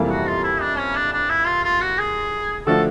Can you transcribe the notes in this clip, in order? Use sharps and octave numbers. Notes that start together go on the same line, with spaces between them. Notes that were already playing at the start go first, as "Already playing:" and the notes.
Already playing: F2 C3 E3 G3 A#3
F#4
F4
E4
D4
C#4
D4
D4
E4
F4
F4
F#4
G#4
D3 F3 A3 D4 F#4 A4